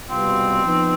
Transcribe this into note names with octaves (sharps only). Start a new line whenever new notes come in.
C2 B2 G3 B3 C4 F4
F3 B3 D#4